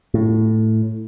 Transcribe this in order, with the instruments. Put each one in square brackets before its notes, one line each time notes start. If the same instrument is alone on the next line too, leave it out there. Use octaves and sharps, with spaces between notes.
[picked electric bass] A2